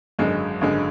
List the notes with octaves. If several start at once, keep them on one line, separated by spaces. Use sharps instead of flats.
G#1 F#2 D3 G#3
G#1 F#2 D3 G#3